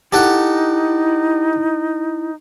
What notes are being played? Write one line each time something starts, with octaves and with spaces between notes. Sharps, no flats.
D#4 E4 G4 A4 F#5